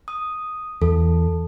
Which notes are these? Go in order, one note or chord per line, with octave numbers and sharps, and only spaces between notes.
D#6
E2 A4